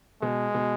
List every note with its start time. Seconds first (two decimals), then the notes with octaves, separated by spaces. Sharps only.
0.22 B2 G#3
0.54 B2